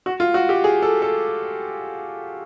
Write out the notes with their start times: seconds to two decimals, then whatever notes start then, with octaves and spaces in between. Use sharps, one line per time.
0.06 F#4
0.20 F4
0.34 F#4
0.49 G4
0.64 G#4
0.82 A4
1.02 A4